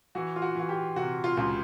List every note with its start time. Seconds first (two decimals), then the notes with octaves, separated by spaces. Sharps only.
0.15 E3 F#4
0.36 F4
0.42 F#4
0.55 E3 F#4
0.69 G4
0.96 C3 F#4
1.24 F4
1.37 C#2 F4